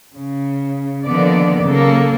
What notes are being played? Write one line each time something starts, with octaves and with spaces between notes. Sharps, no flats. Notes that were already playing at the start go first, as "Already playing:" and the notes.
C#3
D3 D#3 F3 A#3 B3 D5
C#3 F#3 A#3 A4